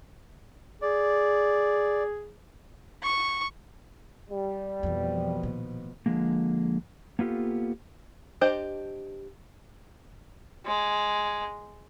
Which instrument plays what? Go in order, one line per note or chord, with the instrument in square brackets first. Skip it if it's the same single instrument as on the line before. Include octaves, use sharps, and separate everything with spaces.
[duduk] G#4 [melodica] D5
[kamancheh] C#6
[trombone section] G3
[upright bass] F2 E3 [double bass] B2 F3
[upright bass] A#2 D#3
[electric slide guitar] D3 F3 G#3 A#3
A#3 B3 F4 G4 A4
[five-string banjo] D4 G4 C5 D#5
[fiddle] G#3